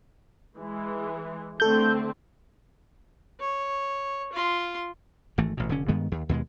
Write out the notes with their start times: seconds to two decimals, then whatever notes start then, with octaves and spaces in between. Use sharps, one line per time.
0.58 E3 G#3
1.60 D3 A3 C4 A4 G6
3.40 C#5
4.33 F4 C6
5.38 G#1 E3 A3
5.57 A1 B2
5.69 F1 D3 C#4
5.88 G2 D#3 G#3 B3
6.12 D#2
6.29 D#2 B2 G3 G#3